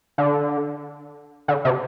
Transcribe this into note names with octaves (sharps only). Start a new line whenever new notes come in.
D3
D3
C3